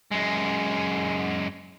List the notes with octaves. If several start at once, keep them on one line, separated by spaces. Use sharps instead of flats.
F#2 G#3